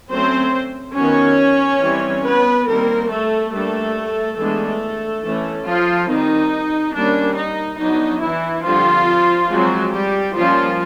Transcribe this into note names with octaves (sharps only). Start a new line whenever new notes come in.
F#3 A3 C4 C#4 C5
D#3 F#3 B3 C#4 C#5
E3 G3 C4
B3 B4
D#3 G3 A#3 C4 A#4
A3 A4
G3 A3 A#3 D4 A4
E3 G#3 A3 B3 D4 A4
E3 A3 C#4
F3 F4
D#3 G3 C4 D#4
D#3 G3 A#3 C#4 D4
D#4
F#3 B3 D4 D#4
E3 E4
D3 F3 G3 C4 F4
F3 F#3 G#3 C4 F#4
G3 G4
F3 G3 A#3 C#4 F4